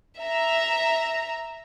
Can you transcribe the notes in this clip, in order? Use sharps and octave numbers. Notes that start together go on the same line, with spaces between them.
E5 A#5